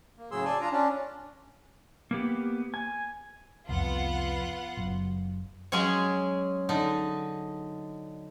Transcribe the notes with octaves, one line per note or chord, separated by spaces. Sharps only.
A#3
A2 C#3 F#3 G#4 C6 E6
D5 G#5 A5 C6
D4 F4 A#5
C#4 D4
A#3 B3 G4
G#5
C2 F2 B3 F4 F#5
F#1 F#2
F#3 G#3 C#4 G#4 C#5
D3 D#4